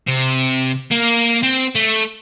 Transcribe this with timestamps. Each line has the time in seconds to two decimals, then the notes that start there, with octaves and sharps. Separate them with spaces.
0.07 C3
0.91 A#3
1.43 C4
1.75 A3